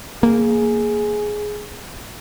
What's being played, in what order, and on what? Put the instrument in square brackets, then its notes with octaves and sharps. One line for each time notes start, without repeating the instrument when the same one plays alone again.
[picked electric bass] A#3 [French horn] G#4